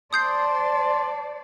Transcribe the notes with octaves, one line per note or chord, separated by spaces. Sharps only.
C5 D5 A5 C6 D#6 G6 C7